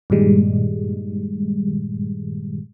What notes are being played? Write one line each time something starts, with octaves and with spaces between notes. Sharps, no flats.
G2 A#2 D#3 G3 G#3